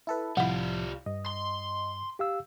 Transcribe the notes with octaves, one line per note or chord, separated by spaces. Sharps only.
E4 A4 B4
C2 A2 F3 G3 E4 F4 F#5
G2 D#5
C6
G4 F5 E6